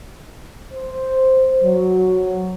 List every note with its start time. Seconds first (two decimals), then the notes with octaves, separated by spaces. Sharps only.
0.73 C5
1.62 F#3